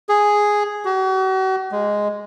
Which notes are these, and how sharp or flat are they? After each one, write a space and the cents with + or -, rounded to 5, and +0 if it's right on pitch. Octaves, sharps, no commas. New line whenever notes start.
G#4 +0
F#4 +40
G#3 -5